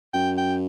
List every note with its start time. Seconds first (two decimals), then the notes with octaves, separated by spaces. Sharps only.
0.14 F#2 G5
0.38 G5